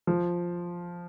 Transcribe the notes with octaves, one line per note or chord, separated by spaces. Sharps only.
F3